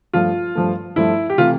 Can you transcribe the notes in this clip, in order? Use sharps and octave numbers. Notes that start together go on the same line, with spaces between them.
G2 F3 A3 F4
G2 F3 A3
G2 F3 A3 E4
G4
C3 E3 A3 F4